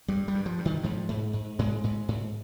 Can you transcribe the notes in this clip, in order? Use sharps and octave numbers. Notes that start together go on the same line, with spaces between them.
G2 G3
G3
G2
F3
G2
D#3
G#2 F3
G#2
G#2
G#2 G#3
G#2
G#2